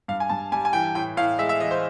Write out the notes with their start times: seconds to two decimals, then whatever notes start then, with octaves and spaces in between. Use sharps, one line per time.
0.08 G2 F5
0.20 G#5
0.29 G2 A5
0.52 G3 G#5
0.65 G#5
0.73 E3 G5
0.95 A2 G5
1.17 A2 F5
1.38 G#3 E5
1.49 E5
1.60 E3 D#5
1.71 C5